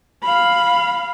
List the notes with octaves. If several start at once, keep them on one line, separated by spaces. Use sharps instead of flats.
F5 B5